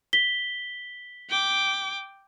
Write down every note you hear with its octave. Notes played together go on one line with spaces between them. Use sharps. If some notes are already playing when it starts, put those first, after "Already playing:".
B6 G7
G5 D6